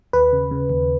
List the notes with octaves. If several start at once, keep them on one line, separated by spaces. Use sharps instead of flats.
D#2 B4
C#3
C#3
D#2